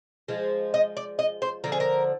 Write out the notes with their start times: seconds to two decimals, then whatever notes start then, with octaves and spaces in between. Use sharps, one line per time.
0.28 F3 G#3
0.74 D#5
0.97 D5
1.19 D#5
1.42 C5
1.64 D3 F3 A#4
1.72 G#4
1.80 A#4